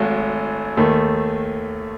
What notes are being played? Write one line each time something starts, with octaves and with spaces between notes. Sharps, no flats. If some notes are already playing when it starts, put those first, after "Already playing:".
Already playing: G#1 G#2 F#3 A3
D#2 D#3 A3